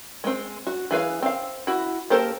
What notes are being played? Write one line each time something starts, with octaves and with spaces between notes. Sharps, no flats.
G#3 C4
F#4
E3 G#4 B4 F5
C4 F5
E4 F#4
A#3 G4 A4 A#4 C5